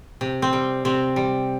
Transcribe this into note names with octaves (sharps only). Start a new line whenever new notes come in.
C3
C4
G3
C3 C4
G3